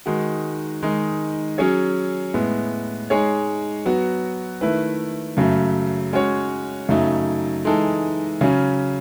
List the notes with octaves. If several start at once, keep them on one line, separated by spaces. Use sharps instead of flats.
D#3 G#3 D#4 F#4
D#3 G#3 D#4
F#3 C#4 G#4 C#5
A2 G#3 B3
G#3 D#4 G#4 C#5
F#3 B3 F#4
D#3 A3 E4 B4
F#2 C#3 F#3 A3
G#3 C#4 F#4 C#5
F#2 C#3 F#3 A3 D#4
E3 G#3 D#4 A4
C#3 F#3 C#4